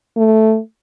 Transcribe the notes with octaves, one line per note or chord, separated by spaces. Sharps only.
A3